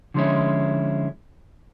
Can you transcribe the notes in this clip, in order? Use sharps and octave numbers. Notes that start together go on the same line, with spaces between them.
D3 F3 G#3 C#4 E4